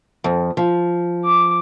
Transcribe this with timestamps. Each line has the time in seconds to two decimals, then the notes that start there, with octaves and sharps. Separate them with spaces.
0.24 F2
0.57 F3
1.25 D6